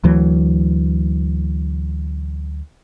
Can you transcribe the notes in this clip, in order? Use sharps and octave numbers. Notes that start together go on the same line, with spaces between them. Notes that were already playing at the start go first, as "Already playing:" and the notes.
D2 E3 F#3